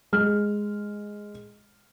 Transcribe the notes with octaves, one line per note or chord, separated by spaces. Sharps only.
G#3 F6